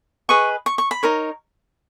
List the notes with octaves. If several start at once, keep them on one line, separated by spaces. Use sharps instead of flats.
G#4 B4 D#5 C#6
C#6
C#6
B5
D#4 A#4 C#5